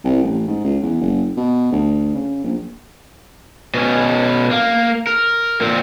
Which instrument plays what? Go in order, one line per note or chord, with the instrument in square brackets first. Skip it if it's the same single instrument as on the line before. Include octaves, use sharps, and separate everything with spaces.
[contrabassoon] C2
A1
G#2
C#2
E2
F#1
B2
D2
C#3
A#1
[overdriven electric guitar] B2 C#4
A#3
A#4
A#2 C4